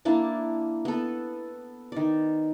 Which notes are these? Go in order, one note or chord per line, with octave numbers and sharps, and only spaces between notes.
A#3 D4 E4 A5
B3 A4
D#3 D5